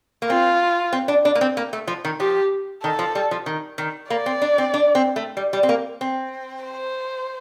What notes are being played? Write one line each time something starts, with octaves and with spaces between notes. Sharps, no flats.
A#3
C4 F4
C4
D4
D4
A#3
C4
A#3
A3
F3
D#3
F3 G4
D#3 A4
F3
G3
F3
D#3
D#3
A#3 D5
C4
D4
C4
D4
C4
A3
G3
G3
C4
A#3
C4
C5